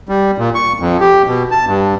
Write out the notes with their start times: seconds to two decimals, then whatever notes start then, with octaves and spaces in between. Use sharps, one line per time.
0.09 G3
0.38 A#2
0.55 C#6
0.80 F2
1.00 G4
1.28 B2
1.51 A5
1.66 G2